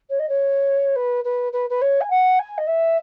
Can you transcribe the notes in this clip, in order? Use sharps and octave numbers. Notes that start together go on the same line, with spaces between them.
C#5
D#5
C#5
B4
B4
B4
B4
C#5
G#5
F#5
G#5
D#5
E5